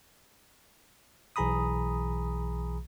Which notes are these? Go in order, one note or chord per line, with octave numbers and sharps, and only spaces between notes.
B1 E3 G#4 A#5 B5 D#6